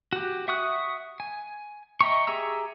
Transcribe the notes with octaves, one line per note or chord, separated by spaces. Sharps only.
F#4 G4
E5 F#5 C#6 D#6 F#6
G#5
D#5 E5 G5 A#5 C#6
G4 G#4 E5 A#5 E6